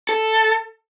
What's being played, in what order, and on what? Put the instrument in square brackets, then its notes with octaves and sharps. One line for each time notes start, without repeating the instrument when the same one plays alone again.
[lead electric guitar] A4